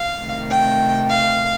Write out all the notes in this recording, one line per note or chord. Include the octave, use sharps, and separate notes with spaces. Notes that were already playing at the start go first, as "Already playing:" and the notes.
Already playing: F5
C3 D#3 A3
G5
F5